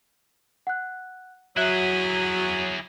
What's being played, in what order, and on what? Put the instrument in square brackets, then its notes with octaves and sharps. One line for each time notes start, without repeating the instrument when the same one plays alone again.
[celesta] F#5 F#6
[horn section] F#3 [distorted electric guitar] E4 G#4 [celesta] E5 F#6 G7